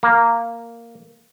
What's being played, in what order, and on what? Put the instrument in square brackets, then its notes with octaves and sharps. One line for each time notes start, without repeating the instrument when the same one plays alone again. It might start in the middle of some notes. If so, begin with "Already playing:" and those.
[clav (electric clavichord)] A#3